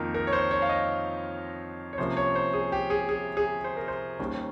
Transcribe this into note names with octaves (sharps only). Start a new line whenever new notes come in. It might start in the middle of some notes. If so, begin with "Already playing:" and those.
Already playing: F2 D#3 A#3 D#4 A#4
A#4
C#5
C5
C#5
F5
D#5
C#5
C2 C3 F3 A#3 C#4 C5
C#5
C5
G#4
G4
G#4
G#4
G#4
C5
A#4
C5
D#2 D#3 G3 C#4